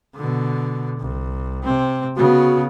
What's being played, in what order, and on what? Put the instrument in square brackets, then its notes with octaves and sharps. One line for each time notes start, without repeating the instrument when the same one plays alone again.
[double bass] B2 D3
C2
C3 C4
[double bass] C#3 B3 [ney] F#4